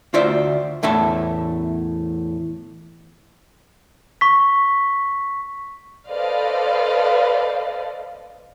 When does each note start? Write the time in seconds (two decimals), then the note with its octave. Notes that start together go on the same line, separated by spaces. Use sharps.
0.14 D2 F4 C5 D5 E5
0.83 E2 A2 E5 A5
4.21 C#6 B6
6.08 A4 B4 C5 D5 D#5 F5